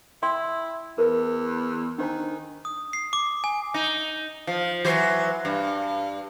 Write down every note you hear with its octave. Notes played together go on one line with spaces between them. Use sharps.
E4 D5 G5 C6
E2 A#4 B4
D#3 D4 C5 G#5
D#6
C7
D6
G#5
D#4
F3
E3 F#3 C5
G2